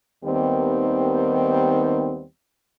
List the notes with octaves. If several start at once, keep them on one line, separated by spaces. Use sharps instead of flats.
D#2 D#3 G3 B3 C4